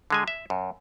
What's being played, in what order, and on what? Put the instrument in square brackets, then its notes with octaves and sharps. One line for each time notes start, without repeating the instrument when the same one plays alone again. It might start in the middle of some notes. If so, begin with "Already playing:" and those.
[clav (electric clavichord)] D3 G#3 G#5
E5
F#2